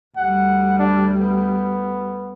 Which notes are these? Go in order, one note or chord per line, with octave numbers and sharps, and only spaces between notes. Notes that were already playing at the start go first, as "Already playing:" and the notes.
D2 G3 F#5
D4
B3